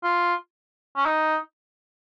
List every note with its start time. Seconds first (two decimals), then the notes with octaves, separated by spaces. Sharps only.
0.03 F4
0.96 C#4
1.06 D#4